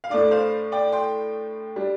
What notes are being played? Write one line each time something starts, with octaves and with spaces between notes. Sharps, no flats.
F5
A2 A3 D4 D5
C5 F5
D5 G5
G5 C6
G3 D4